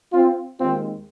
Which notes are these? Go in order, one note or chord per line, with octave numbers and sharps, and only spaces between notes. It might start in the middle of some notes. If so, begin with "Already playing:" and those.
C4 F4
D#2 D#3 G#3 C4 F4